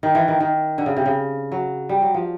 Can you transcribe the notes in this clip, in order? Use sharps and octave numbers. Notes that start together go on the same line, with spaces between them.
D#3
E3
D#3
D#3
D3
C#3
C3
C#3
F#3
G3
F#3
F3